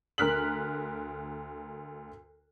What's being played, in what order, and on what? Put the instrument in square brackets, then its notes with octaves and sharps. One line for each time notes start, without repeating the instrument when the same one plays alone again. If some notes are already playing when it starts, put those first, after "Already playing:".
[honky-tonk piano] D2 A#4 F6 F#6 B6 F#7